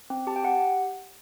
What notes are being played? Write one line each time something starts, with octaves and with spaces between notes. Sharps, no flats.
C4
G4 A5
G5
G4 F#5